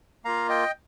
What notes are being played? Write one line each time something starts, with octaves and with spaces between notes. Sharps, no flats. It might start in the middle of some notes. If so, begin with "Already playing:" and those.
A#3 F4 F5 A#5
D#5 G5